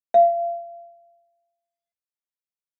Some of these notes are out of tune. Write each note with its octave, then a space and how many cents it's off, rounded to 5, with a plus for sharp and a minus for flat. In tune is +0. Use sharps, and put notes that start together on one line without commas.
F5 -35